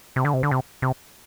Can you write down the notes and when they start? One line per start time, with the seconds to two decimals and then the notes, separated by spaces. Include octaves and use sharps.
0.16 C3
0.25 D3
0.34 C3
0.43 D3
0.51 C3
0.82 C3